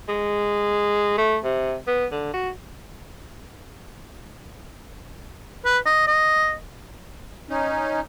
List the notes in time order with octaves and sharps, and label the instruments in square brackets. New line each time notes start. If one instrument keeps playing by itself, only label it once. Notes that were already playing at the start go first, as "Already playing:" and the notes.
[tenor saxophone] G#3
A3
C3
B3
D3
F#4
[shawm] B4
D#5
D#5
[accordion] C#4 D#4